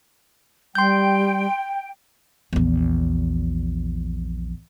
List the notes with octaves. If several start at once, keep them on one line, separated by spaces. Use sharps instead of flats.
G3 G5 C6 G6
A#1 E2